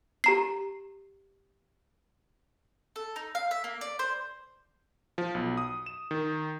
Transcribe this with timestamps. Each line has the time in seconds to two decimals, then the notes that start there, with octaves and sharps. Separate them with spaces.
0.24 G4 A#5 C7
2.96 A4
3.16 D#4
3.35 F5
3.51 E5
3.64 A#3
3.81 D5
3.99 C5
5.18 F3
5.35 B1
5.57 D#6
5.86 E7
6.11 D#3